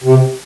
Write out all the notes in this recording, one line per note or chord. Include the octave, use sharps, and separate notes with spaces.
C3